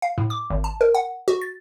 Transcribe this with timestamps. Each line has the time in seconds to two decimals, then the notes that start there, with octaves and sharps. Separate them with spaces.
0.02 F5
0.18 A2
0.30 D6
0.50 G#1
0.64 A5
0.81 A#4
0.95 F#5
1.28 F#4
1.41 A6